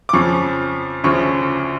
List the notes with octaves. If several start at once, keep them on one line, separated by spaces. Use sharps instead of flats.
D6
F2 C#3 F3 C#6
D2 C#3 F3 C#6